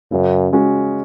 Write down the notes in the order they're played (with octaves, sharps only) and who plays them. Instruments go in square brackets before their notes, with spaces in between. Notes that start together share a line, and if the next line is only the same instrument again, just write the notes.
[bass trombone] F#2 [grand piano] C#3
[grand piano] G#3 C#4 F#4